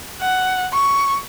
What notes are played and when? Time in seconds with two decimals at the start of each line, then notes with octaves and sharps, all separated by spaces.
0.21 F#5
0.73 C#6